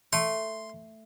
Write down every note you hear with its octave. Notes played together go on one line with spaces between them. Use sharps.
A3 C6